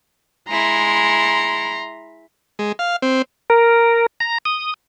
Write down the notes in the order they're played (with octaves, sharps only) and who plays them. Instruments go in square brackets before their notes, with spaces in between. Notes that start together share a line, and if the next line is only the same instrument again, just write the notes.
[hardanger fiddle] G#3 E4 [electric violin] A#5 C6
[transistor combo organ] G#3
F5
C4
[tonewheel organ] A#4
A#5
D#6